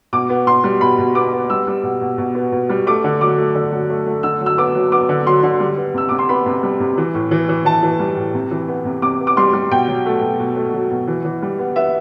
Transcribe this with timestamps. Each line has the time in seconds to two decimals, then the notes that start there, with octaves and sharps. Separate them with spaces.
0.13 B2 D6
0.30 B3
0.47 B2 C6
0.64 G3
0.81 B2 B5
0.98 B2
1.15 B3 D6
1.32 B3
1.50 G3 E6
1.67 G3
1.83 B2
2.01 B2
2.18 B2
2.35 B3
2.52 B2
2.69 G3
2.87 A3 D6
3.04 D3
3.21 F#3 D6
3.38 A3
3.55 D3
3.71 F#3
3.89 A3
4.06 A3
4.23 D3 E6
4.41 F#3
4.46 E6
4.58 B3 D6
4.75 F#3
4.92 B3 D6
5.09 D3
5.26 F#3 C6
5.43 D3
5.60 G3
5.77 B3
5.94 C3 E6
6.09 C3 D6
6.19 C6
6.29 B3 B5
6.46 C3
6.63 G3
6.80 C3
6.98 E3
7.14 A2
7.31 E3
7.49 E3
7.65 E3 A5
7.83 E3
7.99 G3
8.17 A2
8.34 C3
8.51 E3
8.68 B3
8.85 C3
9.02 C3 D6
9.20 B3
9.27 D6
9.37 G3 C6
9.53 G3
9.71 B2 G5
9.88 F#3
10.06 A3
10.22 B2
10.40 B2
10.56 A3
10.74 F#3
10.91 B2
11.07 E3
11.25 E3
11.42 G3
11.59 B3
11.76 B3 E5